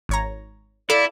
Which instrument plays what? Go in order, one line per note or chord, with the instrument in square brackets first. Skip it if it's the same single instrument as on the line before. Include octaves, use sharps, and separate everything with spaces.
[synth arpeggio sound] G#1 C#5 A#5
[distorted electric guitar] E4 [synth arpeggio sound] A4 F5 D6 [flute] D5